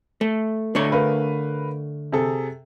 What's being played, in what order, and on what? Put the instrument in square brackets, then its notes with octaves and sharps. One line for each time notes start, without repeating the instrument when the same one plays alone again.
[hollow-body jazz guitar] A3
D3 A3 C#5
[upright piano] A#4 B4 F5
C3 G#4 A4